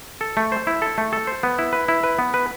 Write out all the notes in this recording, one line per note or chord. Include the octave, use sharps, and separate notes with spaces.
A4
A3
C5
E4
A4
A3
A4
C5
B3
E4
B4
E4
B4
B3
B4